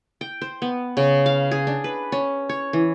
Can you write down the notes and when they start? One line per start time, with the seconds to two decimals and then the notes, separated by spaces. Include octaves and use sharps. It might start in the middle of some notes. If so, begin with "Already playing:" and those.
0.21 G5
0.42 C5
0.62 B3
0.97 C#3
1.26 F5
1.51 G#4
1.67 D4
1.84 B4
2.12 C#4
2.49 C#5
2.73 E3